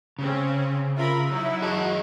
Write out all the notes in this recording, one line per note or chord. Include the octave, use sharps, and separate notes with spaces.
C#3 C4 C#4
F4 A#4 E5 B5
F#3 D#4 E4
F#4 G#4 D#5 A5